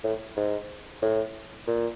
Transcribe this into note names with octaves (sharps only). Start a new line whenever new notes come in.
A2
G#2
A2
A#2